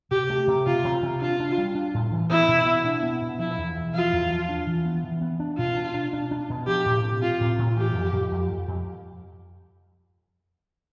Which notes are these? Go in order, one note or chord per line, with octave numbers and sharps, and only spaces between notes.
C3 G4
A3
C3
C3 F4
C3
C3
D4 F4
D4
G3
D4
A2
E3
B3 E4
B2
B3
D4
B3
B2
F3 E4
E2
E2
F3 F4
E2
F3
D4
E3
B3
E3
B3
D4
B2 F4
D4
D4
D4
D4
B2
F3 G4
A2
C4
C4 F4
A2
A2
E3 G4
F2
F2
F2
F2
F2